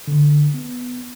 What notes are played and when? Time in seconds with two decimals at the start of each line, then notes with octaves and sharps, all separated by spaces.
0.08 D3
0.54 B3